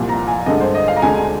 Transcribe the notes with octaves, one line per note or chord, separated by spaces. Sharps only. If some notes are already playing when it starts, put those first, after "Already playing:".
Already playing: C2 A#2 F3
A#5
G#5
G2 D3 G#3 D#5
C5
D#5
F5
A#5
D2 D3 G#3 G#5